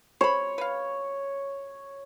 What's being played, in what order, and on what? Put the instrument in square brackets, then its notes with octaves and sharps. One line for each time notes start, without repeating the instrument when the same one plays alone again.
[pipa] C5 B5 [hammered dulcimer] C#5
[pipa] B4 F5